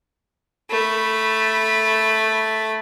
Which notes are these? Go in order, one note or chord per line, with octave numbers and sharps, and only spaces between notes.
A3 B5